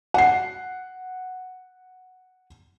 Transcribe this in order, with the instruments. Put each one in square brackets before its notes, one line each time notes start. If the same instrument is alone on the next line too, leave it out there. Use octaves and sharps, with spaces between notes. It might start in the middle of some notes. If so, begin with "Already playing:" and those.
[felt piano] F#5 C7